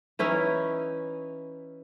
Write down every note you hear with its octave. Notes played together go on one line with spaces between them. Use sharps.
E3 C#4 D#4 E4